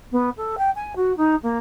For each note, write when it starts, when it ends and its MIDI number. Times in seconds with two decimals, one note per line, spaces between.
0.12 0.30 59
0.37 0.56 69
0.58 0.70 79
0.76 0.93 80
0.96 1.15 66
1.17 1.35 63
1.43 1.58 58